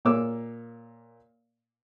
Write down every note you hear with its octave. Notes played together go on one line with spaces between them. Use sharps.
A#2 A#3 C#5 D6 E6